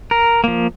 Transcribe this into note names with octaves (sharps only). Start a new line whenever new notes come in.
A#4
F3 A#3